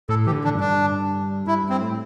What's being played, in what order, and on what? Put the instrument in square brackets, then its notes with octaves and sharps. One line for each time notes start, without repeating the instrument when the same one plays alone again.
[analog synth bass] A2 [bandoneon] A4
[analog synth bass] E3 [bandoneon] G4
[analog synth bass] D3
[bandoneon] D4
[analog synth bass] G2
[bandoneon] D4
[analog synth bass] G2 [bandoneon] E4
[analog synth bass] G2
[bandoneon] C4
[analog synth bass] A2